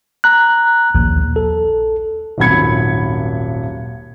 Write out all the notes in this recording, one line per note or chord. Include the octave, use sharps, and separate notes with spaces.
A#5 F#6
A#1 D#2
A4
D#1 G#1 F#3 B5 G#6 C#7